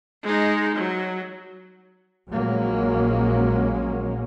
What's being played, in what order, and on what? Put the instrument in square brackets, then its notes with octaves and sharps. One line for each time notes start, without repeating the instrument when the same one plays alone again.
[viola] G#3 D#4
F#3
[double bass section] A#1 F#3 G#3 A#3 C#4